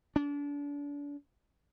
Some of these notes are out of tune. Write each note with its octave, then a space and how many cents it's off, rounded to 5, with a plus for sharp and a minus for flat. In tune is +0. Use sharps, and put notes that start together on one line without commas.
D4 -35